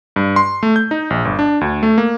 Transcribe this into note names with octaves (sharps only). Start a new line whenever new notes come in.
G2
C6
A3
G6
D#4
A#1
G1
D4
D2
A3
A#3